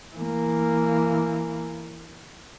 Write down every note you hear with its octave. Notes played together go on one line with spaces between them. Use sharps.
E3 A#3